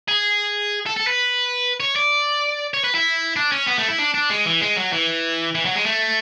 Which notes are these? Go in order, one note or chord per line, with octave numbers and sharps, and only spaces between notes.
G#4
A4
A4
B4
C#5
D5
C#5
B4
E4
D4
C#4
B3
A3
E4
D4
D4
G#3
E3
G#3
F#3
E3
E3
F#3
G#3
A3